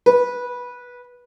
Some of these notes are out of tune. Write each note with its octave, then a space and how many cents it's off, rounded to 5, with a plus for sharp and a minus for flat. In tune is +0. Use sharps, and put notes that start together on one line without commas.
B4 -15